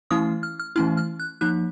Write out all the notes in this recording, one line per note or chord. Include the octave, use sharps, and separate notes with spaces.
E3 A3 C#4 E4 D#6
F6
F6
E3 A3 C#4 E4 F6
F6
F#6
F3 A#3 D#4 F#6